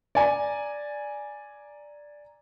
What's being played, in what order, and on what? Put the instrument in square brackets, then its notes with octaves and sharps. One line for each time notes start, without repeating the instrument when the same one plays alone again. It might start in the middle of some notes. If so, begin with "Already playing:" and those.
[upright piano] D5 G#5 A#5